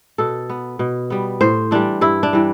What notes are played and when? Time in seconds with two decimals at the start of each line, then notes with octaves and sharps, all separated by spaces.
0.18 B2 A4
0.49 B3
0.79 B2
1.10 G3 B3
1.41 A2 C5
1.71 E3 G3 D4
2.01 G2 E4
2.23 D4
2.33 E3 G3